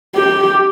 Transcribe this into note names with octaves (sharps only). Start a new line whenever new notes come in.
G4